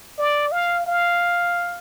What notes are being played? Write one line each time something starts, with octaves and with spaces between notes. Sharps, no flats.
D5
F5
F5